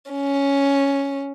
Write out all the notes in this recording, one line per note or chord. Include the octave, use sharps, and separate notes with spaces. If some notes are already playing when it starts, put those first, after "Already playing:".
C#4